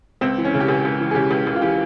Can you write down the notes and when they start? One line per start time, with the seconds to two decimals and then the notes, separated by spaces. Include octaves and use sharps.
0.21 C#2 C4
0.38 E3
0.45 C#4
0.54 C#3
0.60 G4
0.68 C#2 G#4
0.85 C#2
1.00 E3
1.11 G#4
1.15 C#3 G4
1.30 C#2
1.47 C#2
1.55 F4
1.62 E3 G4